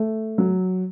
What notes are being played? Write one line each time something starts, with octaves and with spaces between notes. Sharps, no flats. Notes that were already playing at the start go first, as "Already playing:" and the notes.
Already playing: A3
F#3